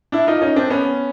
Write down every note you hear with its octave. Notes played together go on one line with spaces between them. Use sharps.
D4 E4
D#4 F4
C#4 D#4
C4 D4
B3 C#4